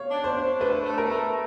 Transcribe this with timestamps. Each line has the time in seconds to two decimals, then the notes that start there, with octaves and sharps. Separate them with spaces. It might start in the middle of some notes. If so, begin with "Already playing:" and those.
Already playing: C#5 F5
0.11 D4
0.24 C5
0.36 D4
0.60 A3 B4
0.85 A3
0.98 A#4
1.10 A3